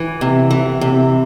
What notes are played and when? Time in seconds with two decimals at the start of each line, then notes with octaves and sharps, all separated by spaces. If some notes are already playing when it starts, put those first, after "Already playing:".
Already playing: E3
0.21 C3
0.51 E3
0.81 C3